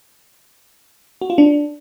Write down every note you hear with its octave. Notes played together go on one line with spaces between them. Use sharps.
F#4
F4
D4